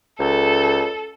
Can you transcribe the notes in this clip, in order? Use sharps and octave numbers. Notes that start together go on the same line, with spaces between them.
C#2 A4